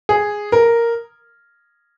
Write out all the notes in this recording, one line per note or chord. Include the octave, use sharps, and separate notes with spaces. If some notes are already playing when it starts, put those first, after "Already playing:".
G#4
A#4